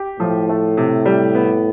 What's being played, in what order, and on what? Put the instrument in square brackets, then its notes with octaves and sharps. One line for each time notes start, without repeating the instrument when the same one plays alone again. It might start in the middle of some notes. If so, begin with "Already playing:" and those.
Already playing: [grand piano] G4
[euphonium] A2 [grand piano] F3
[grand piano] A3
C3
G3
B3